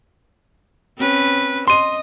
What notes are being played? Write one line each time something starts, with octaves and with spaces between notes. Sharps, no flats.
C4 C#4 B4
D#5 C6 D#7